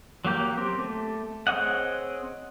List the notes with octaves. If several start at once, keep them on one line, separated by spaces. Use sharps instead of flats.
F#3 A#3 G4 G6
C4 G4
A3
C4 G#4 C#5 D#5 F#5